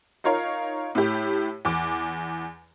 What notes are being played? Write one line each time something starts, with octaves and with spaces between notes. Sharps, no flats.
D#4 F4 A#4 C#5 F5
A2 G4
E2 D6